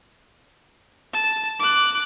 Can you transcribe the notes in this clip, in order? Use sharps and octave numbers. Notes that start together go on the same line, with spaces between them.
A5
D6 F#6